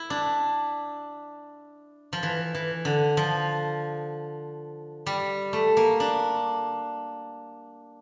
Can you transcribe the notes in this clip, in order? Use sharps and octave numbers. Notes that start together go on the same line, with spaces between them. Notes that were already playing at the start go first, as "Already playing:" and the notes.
Already playing: E4
D4
F3
E3
E3
D3
F3
G3
A3
A#3
D4